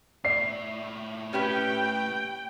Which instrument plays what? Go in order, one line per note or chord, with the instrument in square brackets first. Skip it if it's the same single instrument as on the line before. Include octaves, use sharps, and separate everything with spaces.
[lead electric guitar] A2 E5 [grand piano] D5 C7
[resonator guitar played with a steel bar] C#4 G4 B4 [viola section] G5